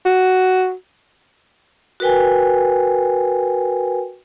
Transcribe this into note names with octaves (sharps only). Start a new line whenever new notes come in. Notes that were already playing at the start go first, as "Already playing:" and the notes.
F#4
F#4 A#4 B4 G5 G#5